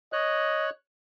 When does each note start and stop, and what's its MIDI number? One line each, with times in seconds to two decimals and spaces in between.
0.13 0.70 73
0.13 0.71 75
0.13 0.70 90